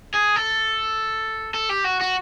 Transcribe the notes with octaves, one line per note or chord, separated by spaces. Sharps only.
G#4
A4
A4
G4
F#4
F#4